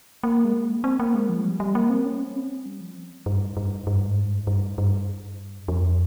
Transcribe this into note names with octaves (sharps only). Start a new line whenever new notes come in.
A#3
G#3
A#3
C4
A#3
G#3
F3
G3
G3
A#3
C4
C#4
C4
G3
F3
G2
G2
G2
G#2
G2
G2
G2
F2